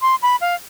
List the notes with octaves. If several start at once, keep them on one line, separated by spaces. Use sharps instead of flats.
C6
B5
F5